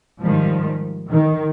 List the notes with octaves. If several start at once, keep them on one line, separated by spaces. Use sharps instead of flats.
G#2 D#3 F3 G3
D#3